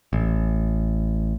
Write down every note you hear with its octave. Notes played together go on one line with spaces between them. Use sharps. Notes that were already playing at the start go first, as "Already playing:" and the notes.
A1